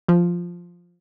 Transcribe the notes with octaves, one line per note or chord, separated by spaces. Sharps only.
F3